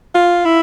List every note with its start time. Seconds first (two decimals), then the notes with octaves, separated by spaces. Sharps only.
0.15 F4
0.45 E4